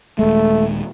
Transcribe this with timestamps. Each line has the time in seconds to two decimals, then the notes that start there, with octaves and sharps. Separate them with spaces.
0.19 D#1 G#3 A3